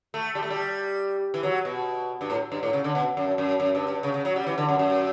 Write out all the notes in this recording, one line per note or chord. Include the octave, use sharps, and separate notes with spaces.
A3
G3
A3
G3
E3
F#3
B2
G2
A2
G2
A2
C#3
D3
B2
F#2
F#2
F#2
G2
G2
C#3
C#3
F#3
G3
E3
D3
F#2
F#2